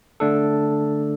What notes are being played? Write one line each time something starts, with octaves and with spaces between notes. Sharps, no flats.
D3 A3 D4 A4